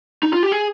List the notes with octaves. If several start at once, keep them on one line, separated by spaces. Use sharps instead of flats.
D#4
F4
G4
G#4